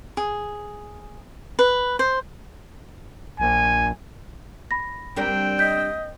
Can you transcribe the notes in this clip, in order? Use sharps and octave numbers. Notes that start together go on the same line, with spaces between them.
G#4
B4
C5
A#1 G#5
B5 A#6
G3 C4 D4 A#4 G5
D#5 G6 B6